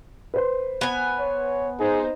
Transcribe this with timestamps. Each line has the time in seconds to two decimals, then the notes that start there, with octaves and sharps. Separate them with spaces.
0.34 B4 C5 C6
0.81 B3 G#5
1.20 C#5
1.80 D#4 G#4 C5